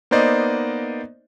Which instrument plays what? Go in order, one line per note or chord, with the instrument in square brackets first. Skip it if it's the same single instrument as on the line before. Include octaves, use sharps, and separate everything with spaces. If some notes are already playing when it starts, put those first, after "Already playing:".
[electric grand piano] A#3 B3 D#4 C5 D5 D#5